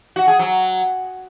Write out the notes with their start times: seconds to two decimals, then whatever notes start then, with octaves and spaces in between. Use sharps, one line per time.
0.16 F#4
0.28 G#4
0.39 F#3